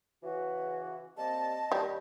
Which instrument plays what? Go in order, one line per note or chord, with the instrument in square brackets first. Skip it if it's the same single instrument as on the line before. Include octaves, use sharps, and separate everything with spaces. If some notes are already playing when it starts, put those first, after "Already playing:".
[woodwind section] C#3 E3 [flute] F#4
[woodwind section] G3 A#3 C4 [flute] D#5 [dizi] A5
[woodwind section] D#2 [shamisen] G3